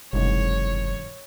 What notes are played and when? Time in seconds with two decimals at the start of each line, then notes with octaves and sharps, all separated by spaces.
0.13 F#1 C2 G#2 E3 C#5